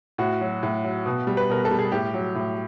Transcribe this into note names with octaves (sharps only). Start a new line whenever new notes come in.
A2 F#4
F#3
A2
F#3
B2
G3
B4
B2 A#4
A4
G3
G#4
A2 G4
F#3
A2